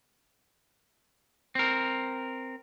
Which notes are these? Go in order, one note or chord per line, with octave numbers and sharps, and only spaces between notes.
C4 A#4